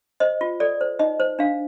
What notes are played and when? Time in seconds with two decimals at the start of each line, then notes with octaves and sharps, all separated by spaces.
0.20 C5 D#5
0.41 F4
0.60 A4 D5
0.81 C5
0.99 D#4 D#5
1.20 C5
1.39 D4 F5